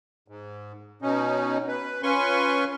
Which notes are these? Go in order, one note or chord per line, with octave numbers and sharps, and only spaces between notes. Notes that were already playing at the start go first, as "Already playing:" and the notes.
G#2
B2 C#4 D#4
B4
C#4 F4 B4 G#5 C6 C#6